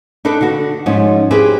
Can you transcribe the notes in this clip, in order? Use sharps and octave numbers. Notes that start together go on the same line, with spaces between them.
D4 D#4 A4 B4
D3 F#4
G#2 F3 C#4
C4 E4 G4 G#4 B4